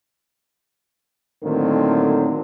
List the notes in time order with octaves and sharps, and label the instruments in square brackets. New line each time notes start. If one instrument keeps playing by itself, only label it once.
[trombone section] A2 D3 D#3 F#3 A#3 C4